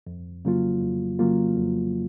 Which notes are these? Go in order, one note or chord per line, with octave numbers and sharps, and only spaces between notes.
F2
C#3 F#3 A#3 F4
F2
C#3 F#3 A#3 F4
F2